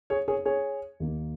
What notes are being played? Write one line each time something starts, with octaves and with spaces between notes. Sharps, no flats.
G#4 C#5
G#4 C#5
G#4 C#5
D#2 D#3 A#3